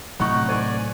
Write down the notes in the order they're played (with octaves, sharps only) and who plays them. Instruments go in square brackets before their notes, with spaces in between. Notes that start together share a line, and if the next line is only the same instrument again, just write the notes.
[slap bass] A2 C3 F#3 [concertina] D#4 F#5 [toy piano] B5 C#6
[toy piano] G4 C5 [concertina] D5 G#5